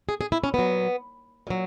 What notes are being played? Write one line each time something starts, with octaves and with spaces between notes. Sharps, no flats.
G#4
G#4
E4
C#4
A#2 F#3 B3
A#2 F#3